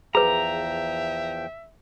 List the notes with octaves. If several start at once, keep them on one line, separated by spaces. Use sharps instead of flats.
E2 F3 G#4 B4 E5 G5 A#5